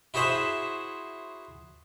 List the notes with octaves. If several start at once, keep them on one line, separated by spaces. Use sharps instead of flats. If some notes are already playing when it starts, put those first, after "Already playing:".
E4 F#4 G#4 C5 E5 F#5